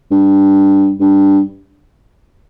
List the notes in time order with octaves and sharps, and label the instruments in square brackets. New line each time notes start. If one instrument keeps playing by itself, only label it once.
[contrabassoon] G2
G2